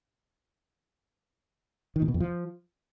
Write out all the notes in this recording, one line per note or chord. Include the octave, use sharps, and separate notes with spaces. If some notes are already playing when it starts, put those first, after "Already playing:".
D#3
A#2
B2
F2
F3